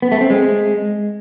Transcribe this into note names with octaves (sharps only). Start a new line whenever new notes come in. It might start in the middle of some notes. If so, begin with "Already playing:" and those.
B3
A3
C4
G#3